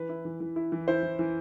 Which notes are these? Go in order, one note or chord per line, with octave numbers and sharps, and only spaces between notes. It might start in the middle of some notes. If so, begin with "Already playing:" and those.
Already playing: E3 B4
E4
E3
E3
E4
E3
E4 C5
E3
E3